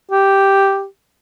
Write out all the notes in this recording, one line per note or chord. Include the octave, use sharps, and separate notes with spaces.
G4